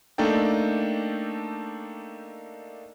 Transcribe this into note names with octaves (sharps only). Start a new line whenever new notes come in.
A3 A#3 D4 D#4 A4 G5